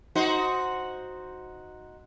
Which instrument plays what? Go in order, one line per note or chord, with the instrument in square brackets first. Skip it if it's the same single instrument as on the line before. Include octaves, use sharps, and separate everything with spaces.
[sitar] D#4 F#4 C5